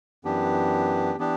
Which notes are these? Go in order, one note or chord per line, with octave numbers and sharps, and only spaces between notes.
F#2 E3 B3 D4 G4
E3 B3 D4 G4